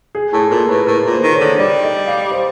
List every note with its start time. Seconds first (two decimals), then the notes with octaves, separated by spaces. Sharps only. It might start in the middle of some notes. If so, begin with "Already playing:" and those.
0.15 G#4
0.33 A2 A4
0.51 A#2 A#4
0.69 A2 B4
0.87 A2 A#4
1.05 A#2
1.12 C5
1.23 D#3
1.35 C#5
1.41 D3
1.59 G3 D5
1.83 D#5
2.07 F5
2.31 C5